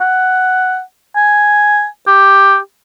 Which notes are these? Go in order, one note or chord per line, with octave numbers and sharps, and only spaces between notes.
F#5
G#5
G4